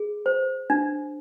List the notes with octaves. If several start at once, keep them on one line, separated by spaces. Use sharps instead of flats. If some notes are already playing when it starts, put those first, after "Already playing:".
Already playing: G#4
C5
D4